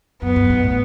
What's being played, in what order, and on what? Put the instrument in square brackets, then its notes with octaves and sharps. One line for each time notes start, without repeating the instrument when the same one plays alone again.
[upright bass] F#2 [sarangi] B3
[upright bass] G2
G#2
A2